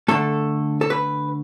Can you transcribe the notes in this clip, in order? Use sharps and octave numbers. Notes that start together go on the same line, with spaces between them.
D3 A3 A4
A4
B4